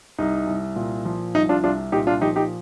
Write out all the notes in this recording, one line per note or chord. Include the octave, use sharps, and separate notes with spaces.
C2 D#4
C2
A#2
F3
C2 D#4
D4 F4
C2 D4 F4
A#2 D#4 G4
D4 F4
F3 D#4 G4
D#4 G4